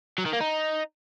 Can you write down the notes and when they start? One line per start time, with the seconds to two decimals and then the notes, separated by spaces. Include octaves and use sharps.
0.18 F#3
0.26 D#3
0.33 A#3
0.41 D#4